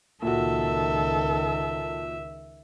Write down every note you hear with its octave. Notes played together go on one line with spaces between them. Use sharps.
C#2 A#2 D#3 F#4 A4 E5